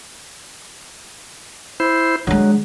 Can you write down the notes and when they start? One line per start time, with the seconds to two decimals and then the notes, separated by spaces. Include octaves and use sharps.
1.80 E4 C5
2.27 D3 F#3 G#3